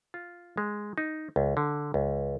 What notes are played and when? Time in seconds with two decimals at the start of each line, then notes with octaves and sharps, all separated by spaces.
0.14 F4
0.57 G#3
0.98 D#4
1.36 C#2
1.57 D3
1.94 C#2